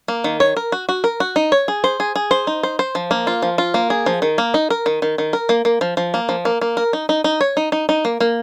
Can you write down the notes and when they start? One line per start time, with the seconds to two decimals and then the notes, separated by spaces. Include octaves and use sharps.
0.08 A#3
0.24 D#3
0.40 C#5
0.57 A#4
0.72 F#4
0.89 F#4
1.04 A#4
1.20 F#4
1.36 D#4
1.52 C#5
1.68 G#4
1.84 C5
2.00 G#4
2.16 G#4
2.31 C5
2.47 D#4
2.63 C5
2.79 C5
2.95 F3
3.11 A#3
3.27 F4
3.42 F3
3.58 F4
3.74 A#3
3.90 G#4
4.06 F3
4.22 D#3
4.38 A#3
4.54 D#4
4.70 A#4
4.86 D#3
5.02 D#3
5.18 D#3
5.33 A#4
5.49 A#3
5.65 A#3
5.81 F3
5.97 F3
6.14 A#3
6.29 F3
6.45 A#3
6.61 A#3
6.77 A#4
6.93 D#4
7.09 D#4
7.24 D#4
7.41 C#5
7.57 D#4
7.72 D#4
7.89 D#4
8.05 A#3
8.20 A#3